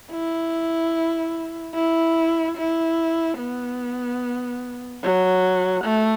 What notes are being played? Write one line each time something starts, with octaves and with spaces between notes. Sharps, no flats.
E4
E4
E4
B3
F#3
A3